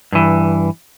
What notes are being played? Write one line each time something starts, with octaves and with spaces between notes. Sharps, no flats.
G2 E3